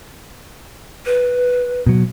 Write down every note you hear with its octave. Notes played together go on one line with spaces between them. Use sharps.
B4
B2 F#3